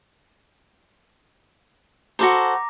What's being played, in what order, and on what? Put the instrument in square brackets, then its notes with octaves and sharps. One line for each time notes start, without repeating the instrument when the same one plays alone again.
[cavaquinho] F#4 A4 C5 [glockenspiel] A#5 D6 A#6